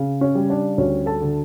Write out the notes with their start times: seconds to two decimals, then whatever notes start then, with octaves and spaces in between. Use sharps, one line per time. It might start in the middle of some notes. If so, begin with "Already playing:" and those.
Already playing: C#3
0.21 C#4 C#5
0.35 G3
0.50 D4 D5
0.78 D2 C#4 C#5
1.06 A4 A5
1.21 D3